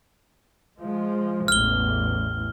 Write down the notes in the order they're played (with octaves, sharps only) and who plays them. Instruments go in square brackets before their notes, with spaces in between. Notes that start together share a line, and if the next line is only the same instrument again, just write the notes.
[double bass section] F3 G#3
[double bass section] A1 E2 [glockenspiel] F6 G7